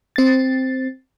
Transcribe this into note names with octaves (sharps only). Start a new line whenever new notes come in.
C4 A6